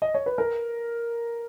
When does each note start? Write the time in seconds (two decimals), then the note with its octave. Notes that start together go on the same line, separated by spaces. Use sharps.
0.02 D#5
0.14 C#5
0.26 B4
0.38 A#4